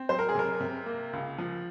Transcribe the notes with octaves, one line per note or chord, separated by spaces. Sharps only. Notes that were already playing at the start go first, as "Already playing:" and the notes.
Already playing: C4
F#3 C5
A#4
G#4
C3 A#4
C3
A#3
C#2
F3